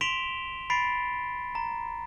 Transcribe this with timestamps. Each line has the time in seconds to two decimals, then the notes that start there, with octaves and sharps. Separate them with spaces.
0.01 C6 B6 D7 E7 F7 G7
0.70 B5 A6 B6 C7 D7
1.55 A#5